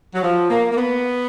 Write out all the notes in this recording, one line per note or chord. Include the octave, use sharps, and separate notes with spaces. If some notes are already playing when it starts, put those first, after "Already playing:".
F#3
F3
A#3
A#3
B3